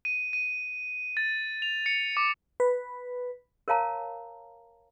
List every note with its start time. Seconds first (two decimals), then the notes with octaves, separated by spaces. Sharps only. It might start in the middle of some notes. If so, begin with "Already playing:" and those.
0.05 D#7
0.33 D#7
1.17 A6
1.62 F7
1.86 C#7
2.17 D6
2.60 B4
3.68 A#4 C#5 F5 A5 A#5